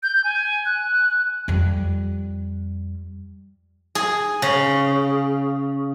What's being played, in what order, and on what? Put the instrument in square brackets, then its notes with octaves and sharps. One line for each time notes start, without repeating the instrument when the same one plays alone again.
[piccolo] G6
G#5
F#6
[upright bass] F2 G3
[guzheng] G#4
C#3